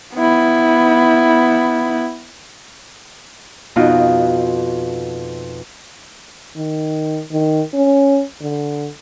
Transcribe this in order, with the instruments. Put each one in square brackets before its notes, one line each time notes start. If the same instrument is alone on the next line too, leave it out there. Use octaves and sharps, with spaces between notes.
[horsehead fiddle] B3 E4
[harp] F2 B2 D#4 F4 F#4 D#6
[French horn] D#3
D#3
C#4
D3